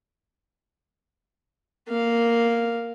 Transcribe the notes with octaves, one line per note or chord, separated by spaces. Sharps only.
A#3 F5